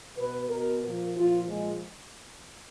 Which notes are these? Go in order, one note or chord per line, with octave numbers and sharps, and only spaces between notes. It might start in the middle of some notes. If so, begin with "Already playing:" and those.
B2 B4
B2 A#4
A#2 F3 A#4
A#2 F3 F4
A#2 F3 G#3